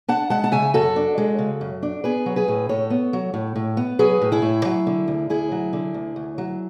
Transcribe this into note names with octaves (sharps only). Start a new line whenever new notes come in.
D4 F#5 A5
G#3 F#5 A5
A5
C#3 E5 G#5
F#2 F#4 A4
D4
G#3
C#3
F#2
D4
B3 G#4 B4
F#3
G#4 B4
A2
A2 A4 C#5
B3
F#3
A2
A2
B3
F#3 G#4 B4
A2
E4 G#4
A2
F#3
D3
D2
D2 E4 G#4
F#3
D3
D2
D2
F#3